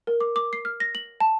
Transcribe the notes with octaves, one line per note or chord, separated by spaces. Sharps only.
A#4
D6
D6
C7
F6
A#6
F#7
A5